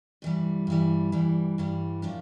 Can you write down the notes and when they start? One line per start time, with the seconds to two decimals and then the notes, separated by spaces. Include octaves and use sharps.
0.22 G2 E3 G3
0.67 G2 E3 G3
1.12 G2 E3 G3
1.58 G2 E3 G3
2.02 A2 F3 A#3 D4 G4